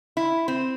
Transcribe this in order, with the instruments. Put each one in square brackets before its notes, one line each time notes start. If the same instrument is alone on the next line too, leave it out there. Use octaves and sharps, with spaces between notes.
[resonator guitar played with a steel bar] E4
C4